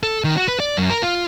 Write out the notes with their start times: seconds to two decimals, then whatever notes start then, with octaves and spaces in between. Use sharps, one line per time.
0.03 A4
0.24 D#3
0.37 F#4
0.48 B4
0.60 D5
0.77 F#2
0.90 A#4
1.03 F4